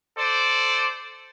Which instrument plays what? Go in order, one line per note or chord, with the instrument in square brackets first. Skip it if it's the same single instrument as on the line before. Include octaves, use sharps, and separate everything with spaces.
[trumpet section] A4 C5 D5